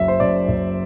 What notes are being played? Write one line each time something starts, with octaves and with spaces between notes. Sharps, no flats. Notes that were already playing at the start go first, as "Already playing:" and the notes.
Already playing: F#1 F#3 E5
C5
F#2 D5
F#1